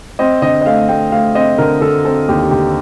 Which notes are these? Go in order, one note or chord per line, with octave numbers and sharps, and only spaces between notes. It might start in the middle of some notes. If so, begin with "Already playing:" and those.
C4 D#5
D3 D#5
D#5
A3 F5
A3 G5
A3 F5
C4 D#5
D3 A#4
D3 A4
C4 A4
D#2 G4
D3 G4